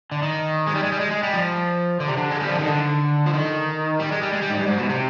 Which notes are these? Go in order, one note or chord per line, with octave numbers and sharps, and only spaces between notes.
D3
D#3
G#3
G3
G#3
G3
G#3
G#3
G3
F3
D3
C3
D3
G#3
G3
F3
D#3
D3
F3
D#3
G3
G#3
G3
G#3
G3
G#2
G2
G#2
B2
C3